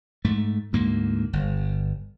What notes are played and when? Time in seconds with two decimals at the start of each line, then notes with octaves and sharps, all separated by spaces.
0.24 G#2 A3
0.73 D2 G#2 A#3
1.33 G1